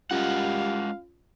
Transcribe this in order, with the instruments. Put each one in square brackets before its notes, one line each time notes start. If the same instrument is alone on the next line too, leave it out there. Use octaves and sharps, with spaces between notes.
[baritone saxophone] G3 [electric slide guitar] G#3 A#4 F#5 [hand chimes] C#4 F4 [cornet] F5